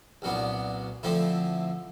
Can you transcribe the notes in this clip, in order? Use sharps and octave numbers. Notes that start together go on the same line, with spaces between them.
C2 A#2 F#3 B3 D4
D3 F3 A3 C4 E4